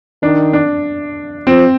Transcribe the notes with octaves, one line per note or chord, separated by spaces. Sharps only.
D#3 D4
D4
F3 C4